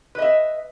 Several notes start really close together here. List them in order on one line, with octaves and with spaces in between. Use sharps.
B4 D#5 E5